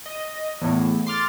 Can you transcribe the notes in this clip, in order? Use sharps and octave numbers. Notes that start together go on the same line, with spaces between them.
D#5
E2 A2
C6 D6 F6 A6